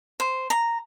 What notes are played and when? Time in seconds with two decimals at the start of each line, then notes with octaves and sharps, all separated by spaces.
0.20 C5
0.50 A#5